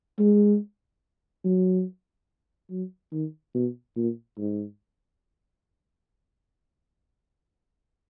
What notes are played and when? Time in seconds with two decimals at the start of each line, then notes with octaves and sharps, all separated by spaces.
0.19 G#3
1.45 F#3
2.71 F#3
3.13 D#3
3.54 B2
3.96 A#2
4.38 G#2